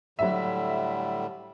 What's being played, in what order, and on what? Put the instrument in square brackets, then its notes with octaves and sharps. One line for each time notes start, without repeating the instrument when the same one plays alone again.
[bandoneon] A2 D3 G3 [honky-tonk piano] F#3 E5